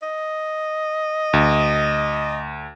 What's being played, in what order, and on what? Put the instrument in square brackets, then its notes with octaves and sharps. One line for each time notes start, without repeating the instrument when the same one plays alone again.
[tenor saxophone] D#5
[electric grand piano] D2